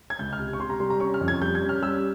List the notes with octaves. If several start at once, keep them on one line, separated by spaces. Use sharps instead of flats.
G#6
C#2 G6
F6
C3
C#6
C3 C6
A#5
G3 C6
A#5
C#4 C#6
F6
F2
G#6
G3 G6
G#6
C#4
F6
G3 E6